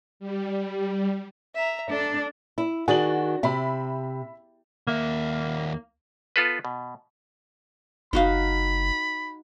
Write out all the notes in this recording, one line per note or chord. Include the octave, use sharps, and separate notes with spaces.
G3
E5 A#5
D4 A4
E4
D#3 D4 F#4 G#4 A6 F#7
C3 E5 B5
D#2 A#3 E5
B3 F4 A4 B4
B2
F#1 D#4 F#4 F5 B5